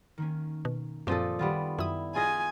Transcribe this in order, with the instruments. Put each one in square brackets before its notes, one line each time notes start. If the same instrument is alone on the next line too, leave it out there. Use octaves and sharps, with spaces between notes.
[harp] D#3 A#3 C#4
[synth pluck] B2
[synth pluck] F#2 C4 [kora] A#2 F3 A4 [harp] D5 D#6
[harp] D#3 [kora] G3 B3 F4
[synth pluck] F#2 D#6 [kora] E4
[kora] F4 G#4 D#5 [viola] G#5